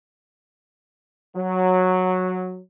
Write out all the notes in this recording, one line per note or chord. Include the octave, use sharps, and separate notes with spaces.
F#3